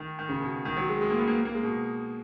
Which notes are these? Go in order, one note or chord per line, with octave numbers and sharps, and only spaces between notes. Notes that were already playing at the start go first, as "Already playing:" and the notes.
Already playing: D#3
D#3
C#3
B2
D#3
F#3
G#3
G#3
A#3
B3
A#3
A#3
G#3
B2